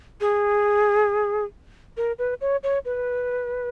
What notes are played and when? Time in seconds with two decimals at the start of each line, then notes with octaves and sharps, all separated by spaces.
0.21 G#4
1.97 A#4
2.19 B4
2.41 C#5
2.63 C#5
2.85 B4